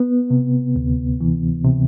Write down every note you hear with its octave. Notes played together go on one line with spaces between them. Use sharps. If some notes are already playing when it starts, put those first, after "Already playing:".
Already playing: B3
C3
D2
E3
C3